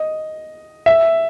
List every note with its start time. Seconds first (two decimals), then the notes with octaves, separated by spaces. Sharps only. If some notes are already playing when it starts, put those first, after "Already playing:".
Already playing: D#5
0.86 E5